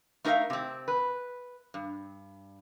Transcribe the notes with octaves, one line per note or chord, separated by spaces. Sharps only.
A3 D#4 A#4 B4 E5 F5
C3 C4
B4
G2